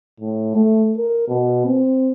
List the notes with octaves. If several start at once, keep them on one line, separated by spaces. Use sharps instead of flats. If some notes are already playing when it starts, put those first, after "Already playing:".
A2
A3
A#4
B2
C4